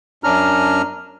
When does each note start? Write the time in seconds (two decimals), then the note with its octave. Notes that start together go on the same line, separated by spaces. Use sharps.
0.24 F#2 C#4 D4 A#5 F6